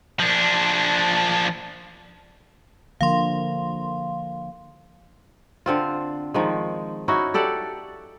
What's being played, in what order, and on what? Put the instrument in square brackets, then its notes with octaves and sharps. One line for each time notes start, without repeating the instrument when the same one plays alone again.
[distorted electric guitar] F3 D4
[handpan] D3 F3 A#3 [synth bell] F5 C6
[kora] D3 C4 F4
D#3 F3 G#3
C#4 D#4 E4 F#4
G4 A4 D5 F#5